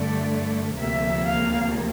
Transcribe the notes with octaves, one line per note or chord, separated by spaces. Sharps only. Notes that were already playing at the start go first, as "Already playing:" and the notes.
Already playing: G2 D3 A3 D5
D2 C3 F3 A#3 E5
F5